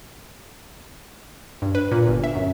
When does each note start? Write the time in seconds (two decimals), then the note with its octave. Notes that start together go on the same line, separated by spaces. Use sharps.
1.62 G2
1.75 B4
1.92 A#2
2.07 G1
2.24 E5
2.35 F#2